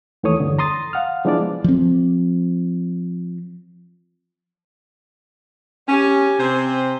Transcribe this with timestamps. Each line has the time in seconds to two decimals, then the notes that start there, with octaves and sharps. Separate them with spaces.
0.23 D#2 E3 A3 C#5 D#6
0.40 E2 G2 D3
0.59 A#5 C6 D#6 A6
0.93 F5 F#5 F6
1.25 F3 G#3 B3 D4 E4 D5
1.64 F3 C4
5.88 C#4 G4 G#5
6.40 C3 C4 C5